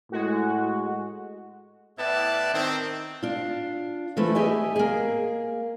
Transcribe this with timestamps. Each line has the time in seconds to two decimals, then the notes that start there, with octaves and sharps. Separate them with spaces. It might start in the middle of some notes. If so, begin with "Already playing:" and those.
0.12 A2 G#3 F#4
1.98 A2 B3 E4 B4 D5 A5
2.54 D#3 C4
3.23 D4 F4
4.17 E3 F3 A3 E4
4.35 G4 G#4 D#5 E5 G#5
4.76 A#3 G#4